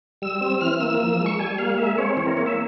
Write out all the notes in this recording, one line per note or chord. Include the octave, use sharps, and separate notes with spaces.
G3 E6
C4 E6
E3 F6
A#3 E6
F3 E6
E6
G#3
C#6
G3 G#5
A#3 F5
G#3 E5
C4 C#5
E3 C#5
A#4
A#3 C#5
E5